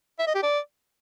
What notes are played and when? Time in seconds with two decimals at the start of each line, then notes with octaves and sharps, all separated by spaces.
0.19 E5
0.27 D#5
0.35 G4
0.43 D5